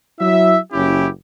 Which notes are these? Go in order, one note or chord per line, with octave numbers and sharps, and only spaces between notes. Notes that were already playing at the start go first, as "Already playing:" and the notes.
F#3 E4 E5
F#1 C#4 E4 G4